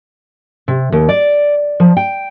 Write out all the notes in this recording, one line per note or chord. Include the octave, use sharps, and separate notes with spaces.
C3
D#2
D5
F3
G5